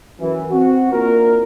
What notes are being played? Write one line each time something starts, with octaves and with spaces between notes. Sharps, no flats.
F#2 E3
C4 F#4
A#3 D4 E4 F4 A#4